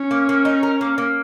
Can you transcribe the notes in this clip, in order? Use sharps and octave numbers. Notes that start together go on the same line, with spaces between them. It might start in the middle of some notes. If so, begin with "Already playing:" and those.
Already playing: C#4
A#3
A#3
D#4
A#4
A#3
A#3